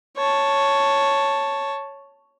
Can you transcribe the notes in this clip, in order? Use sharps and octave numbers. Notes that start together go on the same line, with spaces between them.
C#5 A5